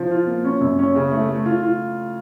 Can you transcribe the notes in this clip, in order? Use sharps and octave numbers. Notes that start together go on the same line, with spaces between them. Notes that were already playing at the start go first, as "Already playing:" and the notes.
Already playing: F3
F4
A#3
C#4
F#2
C#4
C#3
A3
A3
F4
F4